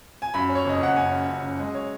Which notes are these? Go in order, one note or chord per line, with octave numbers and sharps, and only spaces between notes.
G#5
F#2 B5
C#4
C#5
F#1 D#5
F#1 F#5
F#1 G#5
C#4
F#2
F#2
G#3 D#5
C#5